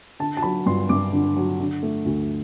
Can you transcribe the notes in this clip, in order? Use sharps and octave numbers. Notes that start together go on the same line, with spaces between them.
D3 A5
A5
F#3 B5
G2 C6
G2 D6
D3
F#3
D3
A3
D2